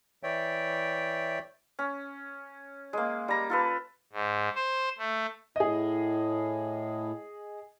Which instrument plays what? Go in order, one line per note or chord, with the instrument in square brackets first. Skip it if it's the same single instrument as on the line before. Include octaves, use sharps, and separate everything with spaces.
[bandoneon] E3 C#5 D5 E5 G5
[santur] C#4
G#3 A#3
G3 A#5
F4 A4 B4
[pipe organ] G#2
C5
A3
[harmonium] A2 [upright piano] G#4 D#5